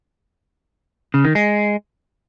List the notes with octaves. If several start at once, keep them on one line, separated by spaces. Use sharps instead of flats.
C#3
D#3
G#3